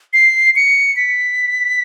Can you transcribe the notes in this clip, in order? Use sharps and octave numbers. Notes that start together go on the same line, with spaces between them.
C7
C#7
B6